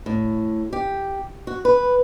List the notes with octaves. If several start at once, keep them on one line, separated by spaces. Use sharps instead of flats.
A2
G4
F#4
B4